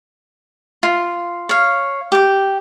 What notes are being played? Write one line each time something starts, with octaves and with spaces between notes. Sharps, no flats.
F4
C#5 F5
G4 D6